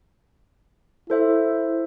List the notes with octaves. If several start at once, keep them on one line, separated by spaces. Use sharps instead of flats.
E4 A4 C5 E5